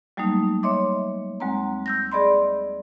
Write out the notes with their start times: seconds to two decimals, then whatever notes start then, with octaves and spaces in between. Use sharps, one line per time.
0.17 F#3 G3 A3 A#3 D#4
0.63 C#5 D#5 E5 C6 D6
1.40 D#2 G#3 C4 A#5
1.86 E6 G6 A#6
2.12 G#4 D5 D#5 B5 C6